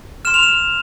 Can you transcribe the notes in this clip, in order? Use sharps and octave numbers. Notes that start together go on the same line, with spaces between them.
C6 F6 E7
F7
E7